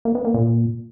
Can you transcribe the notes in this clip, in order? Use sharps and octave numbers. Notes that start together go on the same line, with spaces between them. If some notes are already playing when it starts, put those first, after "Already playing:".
A#3
B3
A#3
A#2